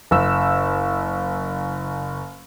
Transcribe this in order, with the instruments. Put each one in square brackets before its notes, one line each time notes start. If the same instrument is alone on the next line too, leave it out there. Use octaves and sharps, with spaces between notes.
[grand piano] F#1 E6